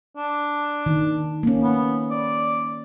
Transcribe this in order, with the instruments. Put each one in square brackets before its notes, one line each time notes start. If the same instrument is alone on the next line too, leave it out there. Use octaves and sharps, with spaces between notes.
[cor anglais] D4
[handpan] D#3
A#3 C#4
[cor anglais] B3
D5